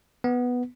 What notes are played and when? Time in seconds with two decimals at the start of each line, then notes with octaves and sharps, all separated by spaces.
0.24 B3